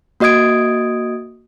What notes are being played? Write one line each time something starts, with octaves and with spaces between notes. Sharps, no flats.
A#3 F#4 D#5 D#6 G#6 D7